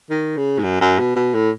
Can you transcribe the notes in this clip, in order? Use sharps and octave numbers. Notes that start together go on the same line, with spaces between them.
D#3
C#3
G#2
F#2
F#2
B2
B2
A2